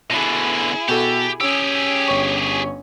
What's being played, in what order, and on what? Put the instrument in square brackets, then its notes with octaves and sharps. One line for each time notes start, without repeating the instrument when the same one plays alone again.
[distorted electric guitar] B2 D3 [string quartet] E4 G#4
[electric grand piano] B2 F#4 A4 [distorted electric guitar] G4
[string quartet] C#4 [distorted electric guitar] G4 G#4 [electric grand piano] E6
[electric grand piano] G1 C#5 C#6